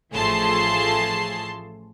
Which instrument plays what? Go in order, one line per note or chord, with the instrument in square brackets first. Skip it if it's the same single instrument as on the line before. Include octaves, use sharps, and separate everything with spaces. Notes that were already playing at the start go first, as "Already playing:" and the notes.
[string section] A1 F3 A3 G#4 A5 C6